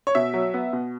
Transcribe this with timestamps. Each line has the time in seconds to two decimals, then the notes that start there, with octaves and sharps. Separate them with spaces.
0.07 C#5
0.15 B2 E5
0.34 F#3
0.54 B3
0.73 B2